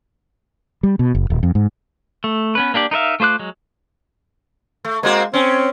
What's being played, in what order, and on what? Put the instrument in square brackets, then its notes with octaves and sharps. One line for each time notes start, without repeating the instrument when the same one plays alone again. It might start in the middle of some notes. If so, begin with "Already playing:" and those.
[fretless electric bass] G3
B2
F#1
D#1
F2
G#2
[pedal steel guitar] A3
B3 C#4 B4
A#3 D4 G4 D5
D#4 A#4 B4 E5 F5
A3 F4 C5 D6 F#6
F#3 G#3
[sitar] A3
[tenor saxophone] G#3 [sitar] A#3 C4 F#4
[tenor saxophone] C4 [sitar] C#4